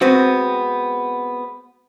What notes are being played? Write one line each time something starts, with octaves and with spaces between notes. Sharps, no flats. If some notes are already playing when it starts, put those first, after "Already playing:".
G#3 B3 C4 F#4